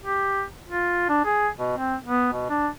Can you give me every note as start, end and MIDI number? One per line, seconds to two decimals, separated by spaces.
0.03 0.42 67
0.68 1.05 65
1.09 1.24 62
1.25 1.48 68
1.58 1.73 47
1.77 1.95 60
2.05 2.29 59
2.32 2.50 47
2.50 2.67 62